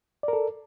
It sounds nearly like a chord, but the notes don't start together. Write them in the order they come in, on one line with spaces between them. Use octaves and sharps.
D5 A#4 A4